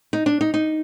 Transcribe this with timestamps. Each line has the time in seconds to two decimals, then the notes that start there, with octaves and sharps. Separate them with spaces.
0.13 D#4
0.26 D4
0.41 D#4
0.54 D#4